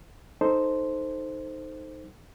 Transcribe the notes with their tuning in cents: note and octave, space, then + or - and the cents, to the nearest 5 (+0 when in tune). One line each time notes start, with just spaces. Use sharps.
D#4 +0 A4 +0 C5 +0